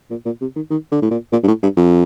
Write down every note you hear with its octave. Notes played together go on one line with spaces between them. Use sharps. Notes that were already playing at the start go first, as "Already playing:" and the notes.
A#2
A#2
C3
D#3
D#3
D3
A2
A#2
A#2
G2
A2
G2
F2